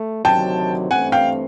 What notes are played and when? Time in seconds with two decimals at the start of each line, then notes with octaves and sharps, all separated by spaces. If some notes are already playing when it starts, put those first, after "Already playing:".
Already playing: A3
0.25 D2 C3 D#3 F#3 G5 A5
0.91 G2 E3 A3 C4 F#5 G#5
1.12 F5 G5